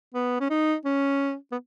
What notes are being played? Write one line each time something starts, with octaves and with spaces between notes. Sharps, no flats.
B3
C#4
D#4
C#4
B3